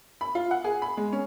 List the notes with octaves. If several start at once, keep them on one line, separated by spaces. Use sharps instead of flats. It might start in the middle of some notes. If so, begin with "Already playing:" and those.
B5
F4
F#5
G#4
B5
G#3
C#4